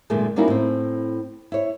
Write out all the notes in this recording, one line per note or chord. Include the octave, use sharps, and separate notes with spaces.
F#2 A#2 D3 D#3 G#3 A3
G3 A#3 C#4 D#4 E4 F#4
A2 C4
E4 C#5